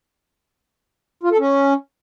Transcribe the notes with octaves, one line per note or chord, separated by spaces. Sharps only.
F4
A4
C#4